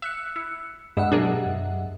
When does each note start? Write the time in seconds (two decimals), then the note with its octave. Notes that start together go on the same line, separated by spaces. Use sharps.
0.02 E5 E6 F#6 C#7
0.36 E4
0.97 G2 G#3 D#5 E5 F#5 E6
1.12 B2 F#3 D4 G4 G#4 A#4
1.46 F#2